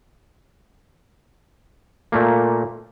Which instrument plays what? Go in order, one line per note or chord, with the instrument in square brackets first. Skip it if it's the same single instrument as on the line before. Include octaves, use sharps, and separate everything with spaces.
[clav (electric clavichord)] A#2 A3 A#3